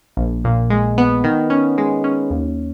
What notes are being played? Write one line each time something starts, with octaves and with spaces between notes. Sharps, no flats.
A#1
A#2
G#3
B3
D#3
C#4
G#3
C#4
D#2